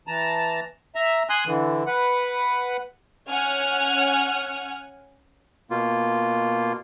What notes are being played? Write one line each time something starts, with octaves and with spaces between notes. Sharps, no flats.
E3 A5 A#5
E5 A#5
G#5 C6 D#6 F#6
D3 E3
B4 F#5
C#4 F#5 G#5 F6
B2 A#3 F4